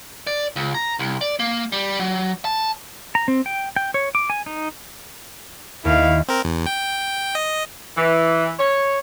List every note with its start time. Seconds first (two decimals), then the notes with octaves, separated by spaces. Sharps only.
0.27 D5
0.56 C#2
0.75 A#5
0.99 C2
1.21 D5
1.39 A#3
1.72 G3
2.00 F#3
2.45 A5
3.15 A#5
3.28 C4
3.46 G5
3.76 G5
3.94 C#5
4.15 D6
4.30 G#5
4.46 D#4
5.85 D#2 E4 F5
6.28 C4 A#4
6.45 E2
6.66 G5
7.35 D#5
7.97 E3
8.59 C#5